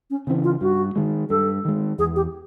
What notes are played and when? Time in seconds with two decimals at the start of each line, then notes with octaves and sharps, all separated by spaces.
0.10 C#4
0.27 C#3 C4
0.30 E3
0.44 F4
0.61 G2 F#4
0.96 D#3 G#3
1.30 G2 A4
1.65 D#3 G#3
1.98 E2 G#4
2.16 G4